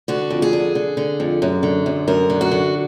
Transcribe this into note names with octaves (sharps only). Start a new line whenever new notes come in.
D3 F#4
F2
G#4
D3
D3
D3
F2
F#2
D3
F#2
F#2 A#4
D3
F#4
D3